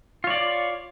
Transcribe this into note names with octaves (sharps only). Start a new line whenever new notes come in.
F4 C#5 D5